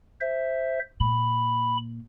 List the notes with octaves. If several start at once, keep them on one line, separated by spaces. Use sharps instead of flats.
C5 E5
A#2 B5